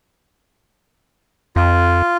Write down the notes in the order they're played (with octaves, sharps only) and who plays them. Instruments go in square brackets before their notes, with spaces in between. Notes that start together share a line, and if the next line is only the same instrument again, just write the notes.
[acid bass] F2 [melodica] F4